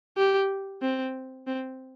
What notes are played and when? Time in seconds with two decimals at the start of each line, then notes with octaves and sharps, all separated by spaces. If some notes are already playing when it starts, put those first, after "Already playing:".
0.17 G4
0.82 C4
1.47 C4